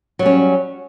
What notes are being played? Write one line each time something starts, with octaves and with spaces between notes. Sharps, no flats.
F#3 G3 C#4